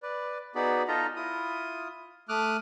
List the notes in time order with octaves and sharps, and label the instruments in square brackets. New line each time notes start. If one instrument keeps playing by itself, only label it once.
[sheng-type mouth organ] B4 D5
B3 D#4 F#4 G#4 D5 B5
D#4 F4 A4 D#5 A#5
E4 F4 D#6
A3 D6 D#6 F6 F#6